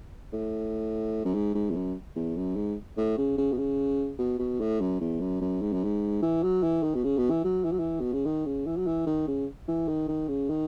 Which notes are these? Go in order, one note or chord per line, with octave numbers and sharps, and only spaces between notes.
A2
F#2
G#2
G#2
E2
F#2
E2
F#2
G#2
A2
C#3
C#3
B2
C#3
B2
B2
A2
F#2
E2
F#2
F#2
G#2
F#2
G#2
E3
F#3
E3
D#3
B2
C#3
B2
E3
F#3
E3
F#3
E3
B2
C#3
D#3
C#3
E3
F#3
E3
D#3
C#3
E3
D#3
D#3
C#3
D#3